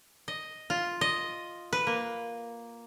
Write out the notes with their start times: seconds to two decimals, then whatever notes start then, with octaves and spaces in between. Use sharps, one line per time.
0.28 D#5
0.70 F4
1.01 D#5
1.73 B4
1.87 A#3